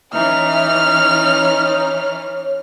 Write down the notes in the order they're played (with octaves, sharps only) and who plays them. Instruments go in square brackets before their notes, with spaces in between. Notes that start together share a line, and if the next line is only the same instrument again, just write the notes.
[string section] E3 C#4 [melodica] D#4 [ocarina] E5 [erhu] F6
[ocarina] C#5